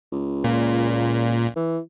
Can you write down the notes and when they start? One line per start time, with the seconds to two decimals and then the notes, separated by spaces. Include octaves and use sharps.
0.12 C#2
0.44 A#2
1.56 E3